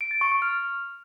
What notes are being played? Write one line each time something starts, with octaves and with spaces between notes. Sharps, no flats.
D7
A6
C#6
C#6
F6